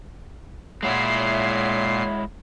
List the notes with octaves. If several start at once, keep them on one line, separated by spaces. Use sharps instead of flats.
A#2 G#3 E4 C#5 E5 F#5 C7